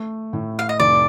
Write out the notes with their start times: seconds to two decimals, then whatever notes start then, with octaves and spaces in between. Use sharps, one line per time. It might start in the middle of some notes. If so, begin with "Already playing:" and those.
Already playing: A3
0.33 A2
0.59 F5
0.69 D#5
0.80 F1 D5